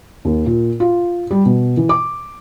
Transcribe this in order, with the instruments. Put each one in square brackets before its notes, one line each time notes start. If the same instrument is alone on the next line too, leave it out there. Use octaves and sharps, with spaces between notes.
[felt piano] D#2
A#2
F4
G3
B2
E3
D6